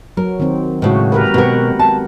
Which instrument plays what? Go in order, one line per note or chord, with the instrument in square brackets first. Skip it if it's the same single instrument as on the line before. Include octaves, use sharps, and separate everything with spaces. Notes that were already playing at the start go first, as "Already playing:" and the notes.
[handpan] F#3 [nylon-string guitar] A#4
[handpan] D#3 C4
[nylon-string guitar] A2 C#3 [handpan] G#3 F#4
[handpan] G4 A#4 B4
[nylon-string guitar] B2 A#4 [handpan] C4 G4 F#5
[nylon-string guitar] A5